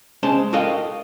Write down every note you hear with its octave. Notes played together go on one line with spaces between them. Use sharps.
G#3 C#4 C5 A5 C6
F#4 A4 A#4 D#5 F5 G5